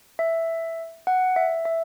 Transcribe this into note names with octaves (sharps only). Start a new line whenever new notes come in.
E5
F#5
E5
E5